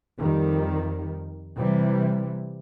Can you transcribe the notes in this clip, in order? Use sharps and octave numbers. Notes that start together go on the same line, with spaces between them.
F2 D#3 G3
C3 E3 G3